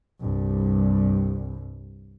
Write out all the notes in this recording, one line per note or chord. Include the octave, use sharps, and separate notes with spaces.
C2 G2